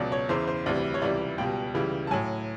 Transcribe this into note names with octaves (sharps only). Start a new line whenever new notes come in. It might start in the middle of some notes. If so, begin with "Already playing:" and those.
Already playing: C#2 B2 F#3 D5
C#5
E2 C#3 E3 C5
C5
D2 C3 E3 G3 D5
C#5
C#2 C3 E3 G3 D5
C#2 B2 G3 G5
C#2 C#3 E3 G3
A5
A2 F#3 G#5